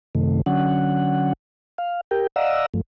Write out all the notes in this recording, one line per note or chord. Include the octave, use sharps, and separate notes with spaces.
F#2 C3 D#3 A3
D3 F#3 C#4 F#5
F5
G4 A#4 G5
D5 D#5 F5 F#5 A#5 E6
G2 F3 A3